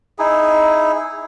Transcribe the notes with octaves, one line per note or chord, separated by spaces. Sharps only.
D#4 E4 G#4